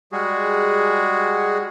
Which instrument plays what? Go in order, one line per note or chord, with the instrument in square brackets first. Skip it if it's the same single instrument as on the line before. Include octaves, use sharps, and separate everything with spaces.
[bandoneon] G3 G#3 F#4 G#4